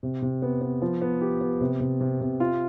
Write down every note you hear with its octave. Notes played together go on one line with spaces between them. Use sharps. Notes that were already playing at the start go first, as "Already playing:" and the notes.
C3
C3
B3
B3
F3
B3
G4
B3
C3
C3
C3
C3
F4